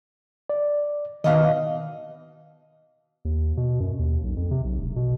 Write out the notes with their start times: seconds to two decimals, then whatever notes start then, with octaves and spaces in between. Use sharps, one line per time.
0.50 D5
1.24 B2 D#3 E3 D#5 F5
3.25 D#2
3.57 B2
3.80 F#2
3.99 D#2
4.24 B1
4.37 F2
4.51 C3
4.65 B1
4.80 E1
4.96 B2